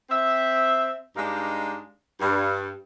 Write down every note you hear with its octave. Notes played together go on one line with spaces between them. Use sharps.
C4 E5
G2 G#3 D4 D#4 G4 F5
G2